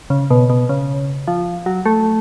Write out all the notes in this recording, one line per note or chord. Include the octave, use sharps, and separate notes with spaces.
C#3
B2
B2
C#3
F3
F#3
A3